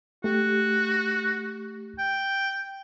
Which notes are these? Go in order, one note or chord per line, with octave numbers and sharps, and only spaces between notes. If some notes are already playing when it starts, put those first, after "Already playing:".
A3 F#4 G4
G5